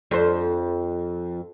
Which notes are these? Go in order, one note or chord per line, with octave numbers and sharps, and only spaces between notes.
F2 C5